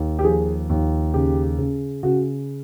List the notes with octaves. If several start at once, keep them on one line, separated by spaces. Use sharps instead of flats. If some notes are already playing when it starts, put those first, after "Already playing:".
Already playing: D#2
G4
F3 G#4
D#2
C#3 G4
C#3
C#3 F#4